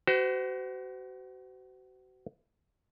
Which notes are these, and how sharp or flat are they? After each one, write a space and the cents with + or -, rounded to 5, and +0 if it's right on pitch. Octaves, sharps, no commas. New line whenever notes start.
F#4 +30 C5 -40